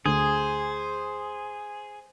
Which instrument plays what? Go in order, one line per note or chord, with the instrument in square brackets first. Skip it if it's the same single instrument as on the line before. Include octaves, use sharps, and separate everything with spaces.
[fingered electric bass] D2 D3 [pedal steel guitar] G#4 [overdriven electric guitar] C5